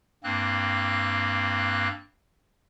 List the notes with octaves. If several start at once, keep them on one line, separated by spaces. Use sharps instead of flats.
G2 A#3 C4 F#6